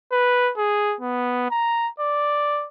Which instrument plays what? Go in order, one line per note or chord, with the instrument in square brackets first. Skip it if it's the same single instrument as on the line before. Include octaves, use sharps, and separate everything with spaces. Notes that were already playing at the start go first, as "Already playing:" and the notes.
[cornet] B4
G#4
B3
A#5
D5